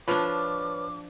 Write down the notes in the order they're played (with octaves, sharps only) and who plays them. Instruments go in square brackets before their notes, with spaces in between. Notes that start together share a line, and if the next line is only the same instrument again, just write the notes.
[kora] F3 D4 [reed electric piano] B4 C#5 F6 [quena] D6